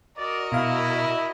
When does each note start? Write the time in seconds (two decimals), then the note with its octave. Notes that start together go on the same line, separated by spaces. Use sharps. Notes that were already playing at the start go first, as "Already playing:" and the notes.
0.17 F#4 A#4 D5 D#5
0.52 B2 E4 F5